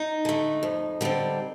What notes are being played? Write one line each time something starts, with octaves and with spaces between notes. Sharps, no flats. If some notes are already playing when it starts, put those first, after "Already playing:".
Already playing: D#4
D3 A3
F2
D3 G3 C4